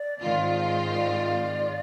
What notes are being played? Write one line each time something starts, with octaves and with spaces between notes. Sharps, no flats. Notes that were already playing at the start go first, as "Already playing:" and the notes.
Already playing: D5
G#2 D#3 G#3 C4 F4
D5